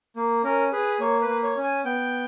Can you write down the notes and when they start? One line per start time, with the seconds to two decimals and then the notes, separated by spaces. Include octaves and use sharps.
0.16 A#3
0.44 C#4 A#4
0.72 G#4 B4
1.00 A#3 C#5
1.22 B4
1.28 A#3
1.43 C#5
1.56 C#4
1.63 G#5
1.85 B3 G5